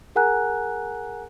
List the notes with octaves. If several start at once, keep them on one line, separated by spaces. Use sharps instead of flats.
G#4 A#4 F#5 G#5 A#5 F#6